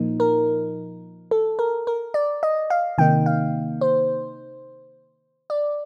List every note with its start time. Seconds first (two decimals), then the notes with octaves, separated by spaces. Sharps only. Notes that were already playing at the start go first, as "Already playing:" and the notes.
Already playing: A#2 F3 A#3 D#4
0.20 A#4
1.31 A4
1.59 A#4
1.87 A#4
2.14 D5
2.43 D#5
2.70 F5
2.98 C3 D#3 A#3 D#4 G5
3.26 F5
3.81 C5
5.50 D5